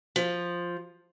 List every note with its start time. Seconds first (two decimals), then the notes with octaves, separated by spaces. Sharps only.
0.16 F3